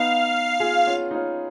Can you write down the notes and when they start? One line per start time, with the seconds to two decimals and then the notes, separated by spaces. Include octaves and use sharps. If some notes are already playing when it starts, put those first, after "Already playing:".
Already playing: B3 D#4 F5
0.60 F4 G#4
0.87 C#4 F4
1.11 D#4
1.15 C#4 F4